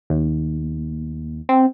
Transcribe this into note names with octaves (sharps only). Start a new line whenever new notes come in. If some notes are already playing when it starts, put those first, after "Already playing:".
D#2
C4